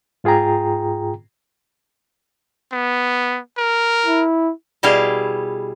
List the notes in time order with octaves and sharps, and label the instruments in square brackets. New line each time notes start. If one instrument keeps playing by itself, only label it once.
[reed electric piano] G#2 F4 G#4 G5 A#5
[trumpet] B3
A#4
[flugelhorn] E4
[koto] B2 G3 E4 G#4 F5